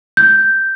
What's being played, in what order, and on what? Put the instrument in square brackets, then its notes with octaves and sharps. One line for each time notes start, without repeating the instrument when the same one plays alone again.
[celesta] G6